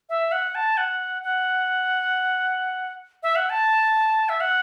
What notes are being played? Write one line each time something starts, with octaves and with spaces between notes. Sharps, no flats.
E5
F#5
A5
F#5
F#5
E5
F#5
A5
E5
F#5